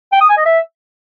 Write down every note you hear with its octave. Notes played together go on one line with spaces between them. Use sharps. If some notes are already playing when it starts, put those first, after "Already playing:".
G5
D#6
G#5
D#5
E5